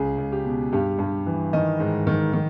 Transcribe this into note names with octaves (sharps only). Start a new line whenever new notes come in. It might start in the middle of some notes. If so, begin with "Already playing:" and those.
Already playing: C#2 G#4
C#2
G4
B2
G2 G4
G2
E3
D#3 D#5
G#2
D#3
D#3